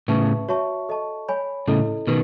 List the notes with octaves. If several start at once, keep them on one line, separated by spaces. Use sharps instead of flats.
A2 C#3 B4 E5 A5 C#6
F#4 C#5 E5 A5 C#6
A4 D#5 A5 C#6
C#5 G#5 B5
A2 C#3 E4 A4 D#5
B2 D#3 B4